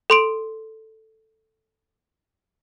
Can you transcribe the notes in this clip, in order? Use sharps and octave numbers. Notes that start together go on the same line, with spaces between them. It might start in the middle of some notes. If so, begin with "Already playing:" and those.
A4 C6 D7